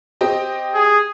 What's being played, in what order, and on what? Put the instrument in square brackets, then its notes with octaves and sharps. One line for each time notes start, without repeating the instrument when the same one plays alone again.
[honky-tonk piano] C4 G4 D#5
[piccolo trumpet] G#4